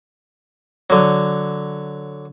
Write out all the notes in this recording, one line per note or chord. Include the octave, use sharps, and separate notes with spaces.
D3 F#3